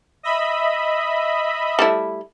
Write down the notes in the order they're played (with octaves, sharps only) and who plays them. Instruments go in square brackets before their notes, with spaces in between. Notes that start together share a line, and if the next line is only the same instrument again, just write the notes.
[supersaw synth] D#5 E5 B5
[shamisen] G3 A3 E4